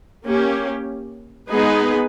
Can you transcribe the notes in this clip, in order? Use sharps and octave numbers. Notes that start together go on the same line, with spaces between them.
A#3 C#4 G4
G#3 B3 D#4 G#4 B4